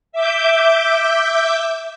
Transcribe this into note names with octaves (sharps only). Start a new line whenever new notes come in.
E5 D6 G6